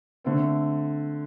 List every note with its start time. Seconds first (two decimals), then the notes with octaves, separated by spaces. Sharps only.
0.24 D3 A3 C4